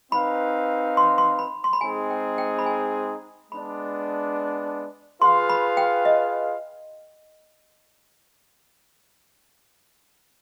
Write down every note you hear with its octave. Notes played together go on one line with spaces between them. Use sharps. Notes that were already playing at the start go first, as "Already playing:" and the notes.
C4 D#4 B4 F5 B5
C6
C6
B5
C6
B5
G#3 C4 D#4 G#4 G#5
G5
G5
B5
G#5
G#3 B3 D4 B5
F4 G#4 B4 F5 C6
B5
G5
D#5